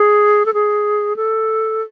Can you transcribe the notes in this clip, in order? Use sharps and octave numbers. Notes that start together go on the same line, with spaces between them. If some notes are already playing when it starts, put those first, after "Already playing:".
Already playing: G#4
A4
G#4
A4